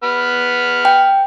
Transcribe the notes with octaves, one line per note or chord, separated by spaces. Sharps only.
B3 B5 F6
G5